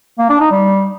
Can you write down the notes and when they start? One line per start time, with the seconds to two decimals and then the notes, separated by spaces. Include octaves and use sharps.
0.18 A#3
0.29 D4
0.40 D#4
0.51 G3